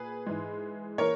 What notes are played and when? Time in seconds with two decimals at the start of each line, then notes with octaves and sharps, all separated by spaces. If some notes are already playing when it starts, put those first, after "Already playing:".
Already playing: A#2 G#4 B4
0.27 G#2 E3 G#3
0.98 E3 A#3 A#4 C#5